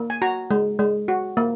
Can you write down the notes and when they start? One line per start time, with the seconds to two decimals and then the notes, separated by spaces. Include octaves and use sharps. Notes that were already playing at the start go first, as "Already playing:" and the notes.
Already playing: A#3
0.10 G#5
0.22 F#4 A#5
0.51 G#3
0.79 G#3
1.08 F#4
1.37 A#3